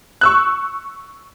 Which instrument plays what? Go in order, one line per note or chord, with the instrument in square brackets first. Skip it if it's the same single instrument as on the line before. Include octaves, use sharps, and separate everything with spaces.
[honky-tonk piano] C#6 E6 F#6